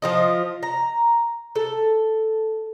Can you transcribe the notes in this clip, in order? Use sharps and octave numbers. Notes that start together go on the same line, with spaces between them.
F3 F4 D#5
A#5
A4